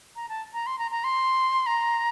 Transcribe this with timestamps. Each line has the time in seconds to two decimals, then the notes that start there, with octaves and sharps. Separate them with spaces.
0.16 A#5
0.29 A5
0.54 A#5
0.67 C6
0.79 A#5
0.91 A#5
1.04 C6
1.66 A#5